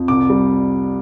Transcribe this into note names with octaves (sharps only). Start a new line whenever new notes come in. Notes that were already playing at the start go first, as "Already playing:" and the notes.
Already playing: F2
C2 D6
G3